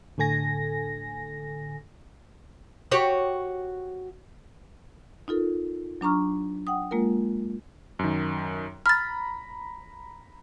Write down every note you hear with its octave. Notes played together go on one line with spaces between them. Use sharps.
A2 D3 A4 G#5 A#6
F#4 G4 C#5
D#4 F4 A4 A#4
F#3 D4 A#5 C#6 F6
F#5 G5 D#6
G#3 A#3 F4 A#4
F#2 D#3
A#5 B5 F6 A6